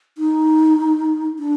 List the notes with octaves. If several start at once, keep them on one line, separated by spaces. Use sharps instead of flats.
D#4
D4